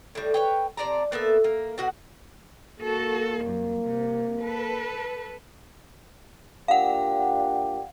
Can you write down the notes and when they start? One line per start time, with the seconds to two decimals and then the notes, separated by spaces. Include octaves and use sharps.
0.15 A2 G3
0.34 B4 C#5 G5
0.77 C3 D5 A5 A#5
1.12 A#3 B3 A4 E5
1.44 A#3
1.78 B2 F#4 F#5
2.80 A#3 F#4 A4
3.38 C2 F#2
3.84 C3
4.39 A4 B4
6.68 A#2 D4 G4 F5 F#5